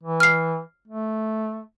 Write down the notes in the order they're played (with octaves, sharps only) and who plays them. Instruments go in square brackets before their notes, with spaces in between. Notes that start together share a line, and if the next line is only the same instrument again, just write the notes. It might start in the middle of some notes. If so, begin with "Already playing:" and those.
[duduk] E3
[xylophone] F6 C7
[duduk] A3